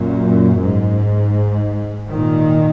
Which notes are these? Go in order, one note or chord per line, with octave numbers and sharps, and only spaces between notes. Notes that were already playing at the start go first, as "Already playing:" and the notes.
Already playing: F#2 A#2
G#2
A#2 D#3